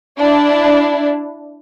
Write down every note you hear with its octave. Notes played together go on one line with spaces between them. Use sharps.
D4 E4